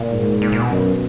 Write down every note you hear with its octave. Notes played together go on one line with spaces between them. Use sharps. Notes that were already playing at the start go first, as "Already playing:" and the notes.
Already playing: A#2
G#2
A#2
A#2
B2
F#2